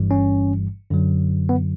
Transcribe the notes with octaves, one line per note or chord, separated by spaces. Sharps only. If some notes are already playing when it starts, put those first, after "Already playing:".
Already playing: G1 G2 E3 G3
C#4
F#2 D3 F#3
B3